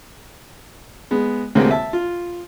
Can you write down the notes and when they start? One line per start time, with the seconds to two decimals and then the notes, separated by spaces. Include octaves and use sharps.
1.11 G#3 B3
1.55 D2 A2 C3 G#3 A#3 C4
1.71 E5 A5
1.93 F4